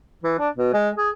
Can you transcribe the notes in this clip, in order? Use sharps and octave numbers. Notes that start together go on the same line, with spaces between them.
E3
D4
B2
G#3
G#4